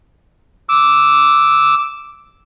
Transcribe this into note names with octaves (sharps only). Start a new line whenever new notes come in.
D6 E6